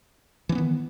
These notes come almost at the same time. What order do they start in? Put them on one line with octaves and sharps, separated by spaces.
E3 C4 B3 D#3